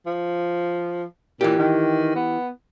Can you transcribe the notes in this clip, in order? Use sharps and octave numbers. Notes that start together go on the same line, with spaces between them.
F3
A#2 E3 G4
D#3
B3